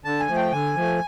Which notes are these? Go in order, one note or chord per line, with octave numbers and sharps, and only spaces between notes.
D3 A5
G#5
F3 A3
G5
D3 G#5
F3 A3